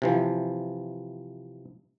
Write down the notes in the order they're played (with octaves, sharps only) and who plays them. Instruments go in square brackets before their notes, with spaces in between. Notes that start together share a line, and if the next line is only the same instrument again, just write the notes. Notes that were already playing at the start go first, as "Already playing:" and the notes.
[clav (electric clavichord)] C3 E3 F3